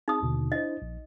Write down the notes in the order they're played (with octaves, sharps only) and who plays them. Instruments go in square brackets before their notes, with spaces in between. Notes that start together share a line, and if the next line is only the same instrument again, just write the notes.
[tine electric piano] C4 G#4 A5 [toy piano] D#4 D#6
[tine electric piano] D#2 B2 D3
[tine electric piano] D4 E4 C5 [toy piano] D#5
[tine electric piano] A#1